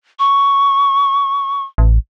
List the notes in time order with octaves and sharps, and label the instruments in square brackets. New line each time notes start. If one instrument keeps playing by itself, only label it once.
[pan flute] C#6
[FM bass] A1